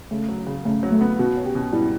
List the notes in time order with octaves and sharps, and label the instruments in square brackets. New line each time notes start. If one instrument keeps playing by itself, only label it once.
[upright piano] C#3 [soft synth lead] A3
[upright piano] F#3
C#3
[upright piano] C#3 [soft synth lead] A3
[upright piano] F#3
[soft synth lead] A3
[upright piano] B3
[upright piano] B2 [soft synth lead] F#4
[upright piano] C#4
[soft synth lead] G4
[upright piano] B2
[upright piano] G3 [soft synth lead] E4